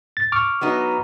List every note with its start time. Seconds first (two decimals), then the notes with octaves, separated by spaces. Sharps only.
0.17 A6
0.32 C#6 D6 F6
0.61 F#3 B3 D#4